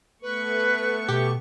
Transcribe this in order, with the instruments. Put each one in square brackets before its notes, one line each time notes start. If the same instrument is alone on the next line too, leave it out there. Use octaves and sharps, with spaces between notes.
[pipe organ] A3 B3 C#6 [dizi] B4
[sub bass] B2 [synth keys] G4